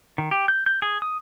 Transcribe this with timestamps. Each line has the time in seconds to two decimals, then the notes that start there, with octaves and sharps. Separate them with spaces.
0.18 D#3
0.31 G4
0.48 G6
0.66 G6
0.82 G#4
1.02 D#6